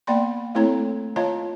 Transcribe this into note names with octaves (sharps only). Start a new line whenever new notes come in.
A#3 B3 D5 G5 B5 C6
A3 C4 E4 A4 C#5 A#5
F4 C#5 D#5 F5 A5 A#5